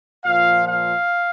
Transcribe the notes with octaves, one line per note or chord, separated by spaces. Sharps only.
A#2 F3 F5
F5